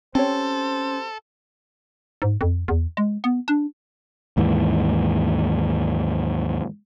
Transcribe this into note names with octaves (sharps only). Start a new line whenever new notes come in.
C4 C#4 G4 A4 C5 C#5
G#2
F2
E2
G#3
B3
D4
D#2 G#2 E3